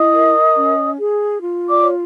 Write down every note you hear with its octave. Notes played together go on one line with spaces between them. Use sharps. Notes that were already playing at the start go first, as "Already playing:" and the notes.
Already playing: E4 D#5 D#6
A#4
C#4
G#4
F4
D5 D6
C#5